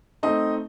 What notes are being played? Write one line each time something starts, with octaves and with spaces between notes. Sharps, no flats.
A3 C4 D#4 D#5